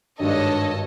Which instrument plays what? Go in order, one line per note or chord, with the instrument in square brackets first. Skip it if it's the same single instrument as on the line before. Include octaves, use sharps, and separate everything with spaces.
[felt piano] G#1 G2 [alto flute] D4 [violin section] A4 C#5 D#5